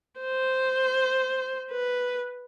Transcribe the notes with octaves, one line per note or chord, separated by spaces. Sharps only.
C5
B4